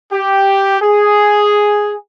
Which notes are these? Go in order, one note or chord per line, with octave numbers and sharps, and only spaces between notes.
G4
G#4